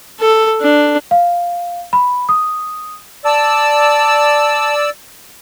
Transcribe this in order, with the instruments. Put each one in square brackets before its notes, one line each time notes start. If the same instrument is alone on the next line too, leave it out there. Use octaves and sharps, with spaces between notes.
[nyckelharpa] A4
D4
[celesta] F5
B5
D#6
[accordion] D5 E6 [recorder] A5